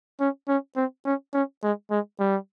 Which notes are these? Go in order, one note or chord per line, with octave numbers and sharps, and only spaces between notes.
C#4
C#4
C4
C#4
C#4
G#3
G#3
G3